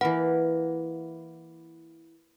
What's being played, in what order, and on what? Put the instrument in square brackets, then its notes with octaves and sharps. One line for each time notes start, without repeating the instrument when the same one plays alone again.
[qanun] E3 A#3 A#4 [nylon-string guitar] B4 [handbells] F#5